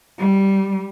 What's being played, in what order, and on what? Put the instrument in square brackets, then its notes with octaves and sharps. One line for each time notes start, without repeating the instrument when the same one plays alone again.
[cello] G3